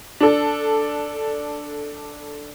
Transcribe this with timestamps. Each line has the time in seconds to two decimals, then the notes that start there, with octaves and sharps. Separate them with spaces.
0.20 D4 A4